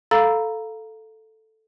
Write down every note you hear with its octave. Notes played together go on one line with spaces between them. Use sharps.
A4 F5 A#5 B5 E6 A6